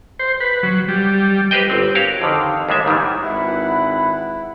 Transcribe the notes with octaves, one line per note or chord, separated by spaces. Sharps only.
C5
B4
F#3
G3
G4 B4 C5 D#5 G5
G1 C4
F#4 G4 A#4 C#5 F5
F2 D3 D#3
D#2 G3 G#3 E5
G#2 D#3 E3 G3
G#1 E4 B4 F#5